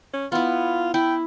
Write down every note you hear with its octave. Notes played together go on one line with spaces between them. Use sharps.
C#4
B3 E4 F4
E4 G5